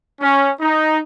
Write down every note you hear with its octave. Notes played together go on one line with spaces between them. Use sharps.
C#4
D#4